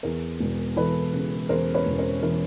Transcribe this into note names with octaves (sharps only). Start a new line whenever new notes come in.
E2 A#4
E1
E3 A4 B4
C#3
E2 A#4 C5
B4 C#5
E1
A#4 C5
E3 A#4